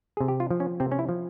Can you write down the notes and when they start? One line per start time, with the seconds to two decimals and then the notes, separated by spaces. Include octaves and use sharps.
0.17 C3 G#4
0.28 G4
0.40 F4
0.51 F3
0.60 C#4
0.80 C3 C4
0.92 C#4
0.99 E4
1.09 F3